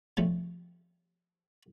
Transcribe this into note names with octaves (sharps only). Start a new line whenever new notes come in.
C3 F3 G3 A3 C4 C#4